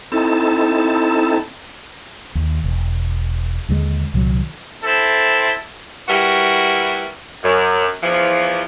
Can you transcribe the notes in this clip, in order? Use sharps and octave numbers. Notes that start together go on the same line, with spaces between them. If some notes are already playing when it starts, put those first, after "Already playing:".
C4 D#4 E4 A4 A5
D#2
E1
D#2 D3 F#3 G#3
C2 A#2 D#3 F#3
C4 E4 A4
G3 E4 F#4 A#4 B4
F#2
E2 E3 F3